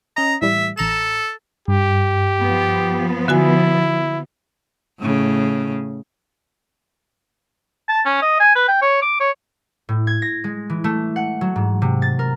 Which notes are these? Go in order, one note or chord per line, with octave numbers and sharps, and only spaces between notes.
C#4 D#5 A#5
A2 E3 G3 E5
A1 A4 A#5 E7
G2 G4
F3 B3
D3 E4 F#4 G#5
A2 C#3
A5
C#4
D#5
G#5
B4
G5
C#5
D6
C#5
A2
G#6
A#6
G#3
E3
A3
F#5
F#3
G#2
C3
A6
A#4